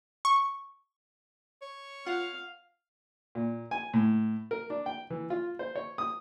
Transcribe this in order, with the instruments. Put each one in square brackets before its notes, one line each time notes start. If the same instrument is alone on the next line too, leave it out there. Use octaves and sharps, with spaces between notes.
[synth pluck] C#6
[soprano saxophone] C#5
[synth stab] F4 F#5 [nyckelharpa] F5
[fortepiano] A#2
G#5
A2
A#4
D4
G5
E3
F4
C5
C#5
D#6